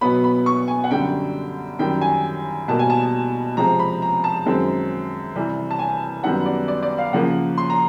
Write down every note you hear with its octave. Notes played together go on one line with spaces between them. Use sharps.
B2 F#3 B3 B5
B5
C#6
G#5
F#5
F#2 D3 G3 G5
F#2 D#3 G3 G5
G#5
B2 G3 A#3 A5
G#5
A5
C3 F3 G#3 C4 A#5
B5
A#5
A5
F#2 D#3 G#3 C4
C3 E3 G3
A5
G#5
F#2 D#3 G3 B3 F#5
D5
D5
D5
F5
C#3 F3 A#3 F#5
C6
A#5